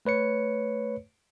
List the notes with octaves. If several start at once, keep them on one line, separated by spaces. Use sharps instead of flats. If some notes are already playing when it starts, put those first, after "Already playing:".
A3 B4 C#5 C#7